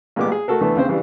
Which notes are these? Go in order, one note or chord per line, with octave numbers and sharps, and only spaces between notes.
A1 A#2 G#3 B3 G4 D6
G#4
A3 F#4 A4 A#4
D2 E3 A3 B3 A5
D#2 C#3 C4 C5
C#3 E3 G3 D4